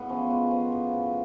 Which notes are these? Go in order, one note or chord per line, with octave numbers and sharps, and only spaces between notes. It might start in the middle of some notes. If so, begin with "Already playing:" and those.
Already playing: A2 G#3 B3
F3 C#4
G#3
F3
A2
A2